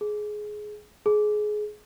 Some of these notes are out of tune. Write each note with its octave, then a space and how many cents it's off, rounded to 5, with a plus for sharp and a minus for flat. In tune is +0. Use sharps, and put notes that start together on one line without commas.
G#4 +15
G#4 +20